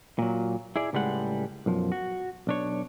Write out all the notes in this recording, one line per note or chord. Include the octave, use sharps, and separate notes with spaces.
A#2 F#3
E4 G#4 D5
C#2 A2 G3 G#3 F#5
B1 F#2 F3
F#4
B1 D4 C#5